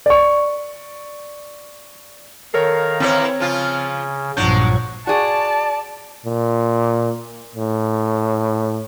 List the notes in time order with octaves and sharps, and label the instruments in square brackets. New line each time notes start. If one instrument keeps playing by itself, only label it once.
[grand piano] D5 C#6
[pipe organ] D#3 F5 A#5 [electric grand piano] A4 A#4 C#5
[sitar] E3 E4 [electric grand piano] C4 C#5
[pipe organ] C#3 [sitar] F3 F4
[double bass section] A#1 G2 F3 [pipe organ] F#3 C#6 [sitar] G#3 D4 [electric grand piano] G6
[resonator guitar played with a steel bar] F#4 G#4 [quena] D5 [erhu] A5
[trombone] A#2
A2